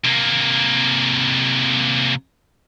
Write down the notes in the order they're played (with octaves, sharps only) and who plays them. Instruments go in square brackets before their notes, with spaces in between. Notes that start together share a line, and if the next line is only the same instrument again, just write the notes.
[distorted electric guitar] C3 A#3